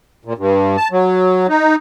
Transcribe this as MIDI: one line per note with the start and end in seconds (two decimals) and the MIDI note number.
0.25 0.33 46
0.38 0.77 43
0.77 0.88 81
0.92 1.47 54
1.48 1.76 63